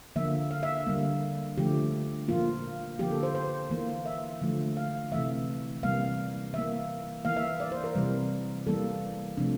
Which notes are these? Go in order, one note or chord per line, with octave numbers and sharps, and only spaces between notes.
D3 F3 A#3 E5
F5
E5
D3 G3 A#3
D3 F3 A3 G4
A#2 F3 A#3 F4
D3 F3 A#3 G4
A4
C5
C5
E3 A#3
E5
D3 F3 A3
F5
C3 E3 A3 E5
C3 E3 G3 A#3 F5
E3 A#3 E5
E3 A#3 F5
E5
D5
C5
A#4
C3 E3 G3
E3 G3 A#3 A4
C3 F3 A3 D4